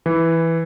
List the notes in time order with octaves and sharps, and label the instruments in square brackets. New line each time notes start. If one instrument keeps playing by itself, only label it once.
[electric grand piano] E3